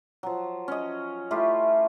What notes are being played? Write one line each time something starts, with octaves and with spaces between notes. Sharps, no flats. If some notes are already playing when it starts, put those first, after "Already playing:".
F3 F#3
C#4 D#5
A3 E4 F4 G4